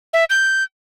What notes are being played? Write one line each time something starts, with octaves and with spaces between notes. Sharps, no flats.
E5
G6